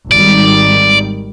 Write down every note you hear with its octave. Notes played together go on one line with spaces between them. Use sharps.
G#1 D#3 G3 D5